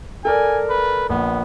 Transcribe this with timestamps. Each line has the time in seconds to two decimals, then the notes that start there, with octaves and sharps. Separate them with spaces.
0.25 A4 A#4 D5 G#5
0.69 B4
1.10 A#1 B3